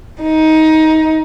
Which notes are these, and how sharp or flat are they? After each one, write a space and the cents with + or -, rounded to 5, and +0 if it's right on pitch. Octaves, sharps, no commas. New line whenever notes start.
D#4 +20